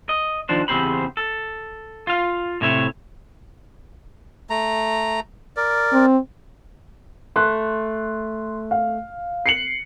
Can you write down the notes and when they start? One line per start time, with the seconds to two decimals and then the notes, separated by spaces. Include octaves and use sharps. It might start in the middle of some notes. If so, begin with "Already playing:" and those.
0.09 D#5
0.49 D#3 F3 D4 C5
0.68 E2 C#3 C4 G4 C5 B5
1.17 A4
2.07 F4 F5
2.61 A2 C3 C#5 E5
4.50 A3 A#5
5.57 A#4 D5
5.93 C4
7.36 A3 C6 F#6
8.71 F5
9.46 C7 C#7 F#7